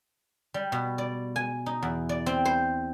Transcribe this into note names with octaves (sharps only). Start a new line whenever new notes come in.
G3
B2
D5
G#5
D#4
E2
D5
C4
C5